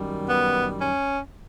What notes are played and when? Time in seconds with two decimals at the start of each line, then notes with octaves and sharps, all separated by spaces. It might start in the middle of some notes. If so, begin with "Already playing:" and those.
Already playing: F#2 D#3 G3
0.27 B3
0.81 C#4